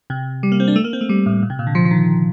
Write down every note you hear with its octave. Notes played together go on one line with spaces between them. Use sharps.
C3
G3
A#3
C4
D4
A3
A#3
C4
A3
G3
A2
A#2
C3
A#2
D3
F3
F3
D#3